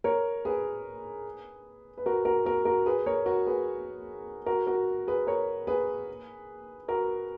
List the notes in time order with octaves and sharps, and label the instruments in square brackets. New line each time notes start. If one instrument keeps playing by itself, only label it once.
[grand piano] A#4 C#5
G#4 B4
B4
F#4 A#4
F#4 A#4
F#4 A#4
F#4 A#4
G#4 B4
A#4 C#5
F#4 A#4
G#4 B4
F#4 A#4
F#4 A#4
G#4 B4
A#4 C#5
G#4 B4
F#4 A#4